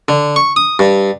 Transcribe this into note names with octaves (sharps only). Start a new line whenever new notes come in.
D3
C#6
D#6
G2